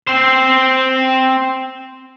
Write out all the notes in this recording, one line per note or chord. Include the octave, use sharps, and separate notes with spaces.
C4 C5